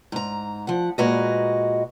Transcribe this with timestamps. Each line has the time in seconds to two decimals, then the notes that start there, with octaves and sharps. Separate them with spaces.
0.12 G#2 A#5
0.67 F3 F#5
0.98 A#2 G#3 F#4 A#4 B4 D#5